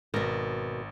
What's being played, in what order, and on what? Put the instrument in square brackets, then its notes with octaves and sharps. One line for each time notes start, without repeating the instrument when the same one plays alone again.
[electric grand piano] G#1 [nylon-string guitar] B2 A#4